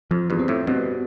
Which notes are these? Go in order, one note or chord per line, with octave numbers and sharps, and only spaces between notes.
F2 F3
E2 G2
C4
F2 A2
G2 B2 C4